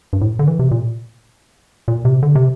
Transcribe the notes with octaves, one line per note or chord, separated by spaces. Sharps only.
G2
A2
D3
E3
C3
A#2
A#2
C3
D3
C3